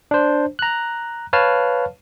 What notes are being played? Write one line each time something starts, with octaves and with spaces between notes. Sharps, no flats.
D4 C5
A#5 F#6
B4 C#5 F5 A5 F6